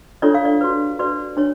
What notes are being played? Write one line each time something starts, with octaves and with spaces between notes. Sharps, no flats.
D4 F4 A4 C#5 D5
F5
D5
F#4 B4
F#4 B4 D5
D4 C#5